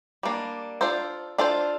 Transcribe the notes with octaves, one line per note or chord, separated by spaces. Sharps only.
G3 A#3 D4
D4 F4 A4 C5
D4 F4 A4 C5